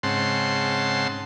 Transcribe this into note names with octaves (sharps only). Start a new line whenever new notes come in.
G#2 C#3 C4 F#5 A5 C6